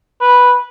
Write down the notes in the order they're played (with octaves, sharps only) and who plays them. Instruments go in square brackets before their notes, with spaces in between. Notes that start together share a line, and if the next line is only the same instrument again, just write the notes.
[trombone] B4